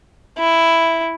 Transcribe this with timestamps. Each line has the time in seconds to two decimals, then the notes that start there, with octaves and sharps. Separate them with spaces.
0.38 E4